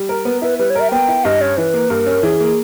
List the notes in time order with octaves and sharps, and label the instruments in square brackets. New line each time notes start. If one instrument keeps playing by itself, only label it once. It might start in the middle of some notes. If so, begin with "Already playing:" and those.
Already playing: [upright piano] G3
A#4
[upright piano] B3 [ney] B4
[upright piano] E4 [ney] B4
[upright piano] G3 [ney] B4
[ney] C#5
[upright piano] A#4 [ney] E5
[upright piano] B3 [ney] G5
[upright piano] E4
[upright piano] G2 [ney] D#5
[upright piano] C#4 [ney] C#5
[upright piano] E3 [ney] B4
[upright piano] A#3
[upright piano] G2 [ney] A#4
[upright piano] C#4
[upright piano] E3 [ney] G#4
[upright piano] A#3